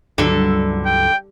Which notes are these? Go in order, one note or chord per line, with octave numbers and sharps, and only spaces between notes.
C#2 G2 D3 F#3 G3 A4
G5